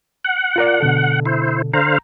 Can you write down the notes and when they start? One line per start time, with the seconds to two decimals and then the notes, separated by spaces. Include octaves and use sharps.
0.25 F#5
0.56 F4 A#4 D5
0.80 B2 D3 A4
1.25 E4 C5
1.73 D3 C5 F5 A#5